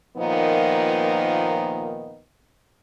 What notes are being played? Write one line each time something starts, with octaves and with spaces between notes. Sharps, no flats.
A#2 D#3 F3 A#3 B3 D#4